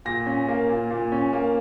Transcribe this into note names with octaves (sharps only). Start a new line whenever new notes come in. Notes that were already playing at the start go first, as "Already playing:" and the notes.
A#2 A#6
C#4
A#3
A#2
A#2
C#4
A#3